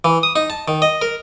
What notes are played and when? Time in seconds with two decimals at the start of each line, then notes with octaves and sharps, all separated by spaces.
0.05 E3
0.23 D#6
0.36 D#4
0.50 A5
0.68 D#3
0.82 D#5
1.02 A#4